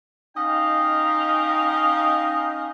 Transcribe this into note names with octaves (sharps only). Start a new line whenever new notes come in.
C#4 D#4 D#5 F5 G5